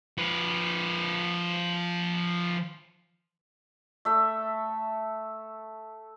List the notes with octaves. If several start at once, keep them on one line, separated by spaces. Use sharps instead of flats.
F3 B4
A3 E5